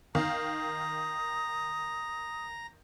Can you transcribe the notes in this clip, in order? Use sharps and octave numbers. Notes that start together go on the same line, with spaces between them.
D#3 F5 A#5 D#6